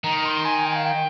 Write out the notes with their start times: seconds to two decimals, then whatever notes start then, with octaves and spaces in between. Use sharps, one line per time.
0.04 D#3 A#5
0.25 C6
0.45 G#5
0.66 G5
0.76 F5
0.85 G5